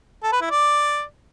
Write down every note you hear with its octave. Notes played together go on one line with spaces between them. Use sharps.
A4
B4
E4
D5